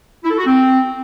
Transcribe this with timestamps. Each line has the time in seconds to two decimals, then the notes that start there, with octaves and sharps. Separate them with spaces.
0.23 E4
0.31 A4
0.38 F#4
0.45 C4